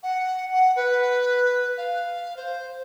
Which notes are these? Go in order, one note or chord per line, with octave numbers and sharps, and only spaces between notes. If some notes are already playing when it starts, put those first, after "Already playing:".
F#5
F#5
B4
F5
C5